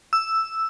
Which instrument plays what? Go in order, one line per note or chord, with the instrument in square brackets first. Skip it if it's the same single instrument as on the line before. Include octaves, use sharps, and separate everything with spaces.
[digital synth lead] E6